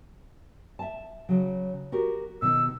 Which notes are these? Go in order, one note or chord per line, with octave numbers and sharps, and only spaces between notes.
E5 A5
C#3 F#3
F#4 G4 A#4
B2 D#3 D#4 E6